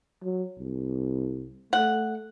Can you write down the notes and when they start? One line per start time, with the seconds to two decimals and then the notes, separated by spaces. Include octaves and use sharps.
0.23 F#3
0.58 C2
1.73 A3 F#5